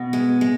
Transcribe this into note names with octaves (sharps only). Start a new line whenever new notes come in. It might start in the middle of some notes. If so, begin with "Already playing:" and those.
Already playing: B2
G#3
G#3